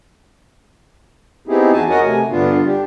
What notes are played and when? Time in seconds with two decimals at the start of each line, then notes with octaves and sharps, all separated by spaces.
1.48 B3 C4 D#4 E4 G4 G#4
1.73 E2 F#4 G#5 A5
1.89 F#4 A#4 C#5 D#5 F#5 G#5
2.03 C3 A3 G#5
2.30 G2 D3 B3 D4 F4
2.65 D4 G4